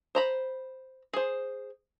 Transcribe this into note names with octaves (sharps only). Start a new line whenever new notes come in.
C5 A#5 B5
G#4 C5